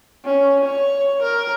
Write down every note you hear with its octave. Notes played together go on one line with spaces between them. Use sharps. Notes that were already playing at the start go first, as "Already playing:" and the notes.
C#4
C#5
A#4